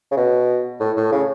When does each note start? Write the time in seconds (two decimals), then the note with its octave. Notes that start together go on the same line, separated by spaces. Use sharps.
0.12 C#3
0.17 B2
0.80 A2
0.97 A2
1.12 C#3